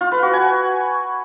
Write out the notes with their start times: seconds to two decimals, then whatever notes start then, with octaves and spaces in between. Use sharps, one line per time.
0.01 F4
0.12 B4
0.23 F#4
0.33 G#5